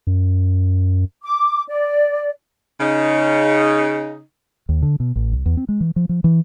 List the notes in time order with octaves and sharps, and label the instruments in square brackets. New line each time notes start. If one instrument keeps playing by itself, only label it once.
[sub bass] F#2
[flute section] D6
D5
[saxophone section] C#3 D#4
[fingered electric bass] D#2
D3
B2
A1
C2
E2
C4
G#3
E3
F3
F3
E3